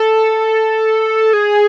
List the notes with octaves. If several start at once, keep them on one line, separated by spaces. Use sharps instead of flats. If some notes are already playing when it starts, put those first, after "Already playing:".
Already playing: A4
G#4